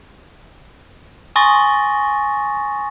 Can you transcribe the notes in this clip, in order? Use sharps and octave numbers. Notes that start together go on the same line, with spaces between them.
G#5 C6 C#6 D#6 A6 A#6